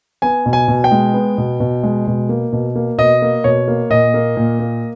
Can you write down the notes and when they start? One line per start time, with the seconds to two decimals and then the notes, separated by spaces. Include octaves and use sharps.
0.22 B3 G#5
0.46 B2
0.53 G#5
0.68 B2
0.84 G5
0.91 G#3
1.14 B3
1.38 B2
1.60 B2
1.83 G#3
2.07 B2
2.29 A#3
2.52 B2
2.75 A#3
2.98 B2 D#5
3.22 A#3
3.44 B2 C#5
3.68 A#3
3.90 A#2 D#5
4.14 A#3
4.36 A#2
4.60 A#3